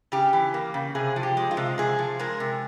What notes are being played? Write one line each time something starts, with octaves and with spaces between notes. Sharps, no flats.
C#3 G4
E3
A#3
C#3
C3 G#4
F3
G4
G#3
F4
C3
C3 G#4
F3
G#3 A#4
C3